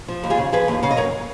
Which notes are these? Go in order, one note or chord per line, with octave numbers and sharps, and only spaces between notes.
F3
D#2
F4 G#4
C#3
F3 G#4 B4
D#2
C#3 F5
D#5
F#2 A#4 C#5